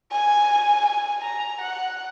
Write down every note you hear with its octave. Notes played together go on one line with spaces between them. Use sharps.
G#5
G#5
A#5
F#5